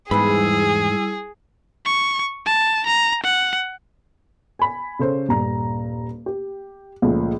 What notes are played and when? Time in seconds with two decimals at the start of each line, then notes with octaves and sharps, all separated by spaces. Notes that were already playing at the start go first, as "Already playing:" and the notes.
0.11 E2 G#2 G3 E4 G#4 B4 B5 E6
1.85 C#6
2.46 A5
2.86 A#5
3.23 F#5
4.59 G#5 B5
4.99 C#3 A4 C5 C#5
5.28 D#1 G2 A#5
6.26 G4
7.02 C#2 A#2 F3 A3